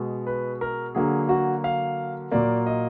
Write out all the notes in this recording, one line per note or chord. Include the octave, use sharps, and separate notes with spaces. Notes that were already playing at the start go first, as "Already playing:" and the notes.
Already playing: B2 G#3
B4
A#4
D3 F#3 A#3 G#4
F#4
F5
A#2 F#3 A#3 D5
D#5